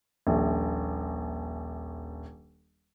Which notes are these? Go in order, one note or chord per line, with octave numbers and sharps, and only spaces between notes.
D#1 A#1